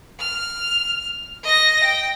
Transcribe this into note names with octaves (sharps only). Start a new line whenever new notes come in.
F6
D#5 A#6
G5